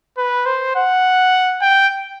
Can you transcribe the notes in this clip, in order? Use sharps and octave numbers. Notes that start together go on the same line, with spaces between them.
B4
C5
F#5
G5